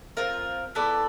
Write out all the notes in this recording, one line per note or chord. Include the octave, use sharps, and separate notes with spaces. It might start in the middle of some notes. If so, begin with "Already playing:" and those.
C4 F4 A#4
B3 E4 A4 D5